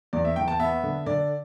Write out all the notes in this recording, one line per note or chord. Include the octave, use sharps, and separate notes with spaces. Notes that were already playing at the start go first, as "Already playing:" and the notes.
E2 D5
E5
E2 G5
A5
B3 E5
D3
D3 D5